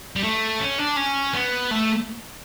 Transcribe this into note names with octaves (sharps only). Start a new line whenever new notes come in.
G3
A3
C#4
D4
C#4
B3
A3